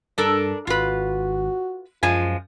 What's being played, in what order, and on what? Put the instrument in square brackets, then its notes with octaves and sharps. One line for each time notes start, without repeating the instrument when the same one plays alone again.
[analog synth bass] G2 [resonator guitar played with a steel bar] D4 A4 A#4
[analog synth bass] G#1 [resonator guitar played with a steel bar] F4 B4 [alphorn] F#4
[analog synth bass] F#2 [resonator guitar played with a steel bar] F3 G#3 G#5 [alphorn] F4